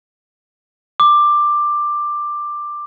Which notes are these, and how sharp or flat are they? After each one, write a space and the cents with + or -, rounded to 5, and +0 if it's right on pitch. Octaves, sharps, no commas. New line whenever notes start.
D6 +10